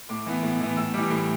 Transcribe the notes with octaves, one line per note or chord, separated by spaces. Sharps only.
A2 D6
E3 B3
A2
E3 B3
A2 E6
E3 G3 D6
A2